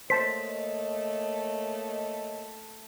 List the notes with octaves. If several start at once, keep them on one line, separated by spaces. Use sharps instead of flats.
A3 A#3 C5 C#5 D#5 A5 B6